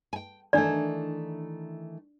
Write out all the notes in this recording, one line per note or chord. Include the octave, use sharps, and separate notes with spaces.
G5 G#5
D#3 E3 A3 D4 D5